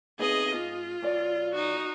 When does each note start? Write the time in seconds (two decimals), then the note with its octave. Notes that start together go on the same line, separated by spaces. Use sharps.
0.19 C3 B3 D#4 G#4 D#5
0.54 G#2 F4
1.02 B1 D5
1.52 D#4 F#4